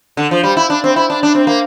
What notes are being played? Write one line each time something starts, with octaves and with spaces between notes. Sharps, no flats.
D3
F3
G3
E4
D4
C4
E4
D4
D4
C4
A#3